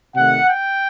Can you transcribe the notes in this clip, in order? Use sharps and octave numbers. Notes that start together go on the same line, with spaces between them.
C3 D#3 A3 F#5
G5